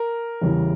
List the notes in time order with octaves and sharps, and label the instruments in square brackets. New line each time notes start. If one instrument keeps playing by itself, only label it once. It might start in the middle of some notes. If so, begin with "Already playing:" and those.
Already playing: [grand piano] A#4
E2 C#3 E3 G3